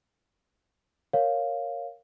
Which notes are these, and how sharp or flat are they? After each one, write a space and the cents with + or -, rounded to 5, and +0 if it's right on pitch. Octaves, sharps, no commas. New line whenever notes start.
A#4 +0 C#5 +0 F5 +0